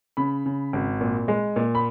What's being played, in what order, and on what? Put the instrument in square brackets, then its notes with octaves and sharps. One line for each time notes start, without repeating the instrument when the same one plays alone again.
[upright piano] C#3 B5
C#3
G#1
A#2
G#3
A#2
B5